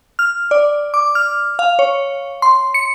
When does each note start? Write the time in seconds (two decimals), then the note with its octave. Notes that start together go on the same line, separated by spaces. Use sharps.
0.19 F6
0.51 D5
0.94 D6
1.15 F6
1.59 F5
1.79 C#5
2.42 C6
2.74 C#7